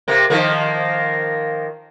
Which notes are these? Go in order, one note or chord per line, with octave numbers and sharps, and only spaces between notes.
C3 A#3
D#3 F3 A#3